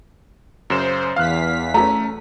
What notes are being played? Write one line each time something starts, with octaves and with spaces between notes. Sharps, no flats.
F#2 C#3 C5 E7
E2 F5 F6 F#6 B6
A3 C#4 G#4 A#5